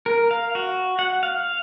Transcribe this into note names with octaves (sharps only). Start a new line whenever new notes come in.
A#4
F5
F#4
F#5
F5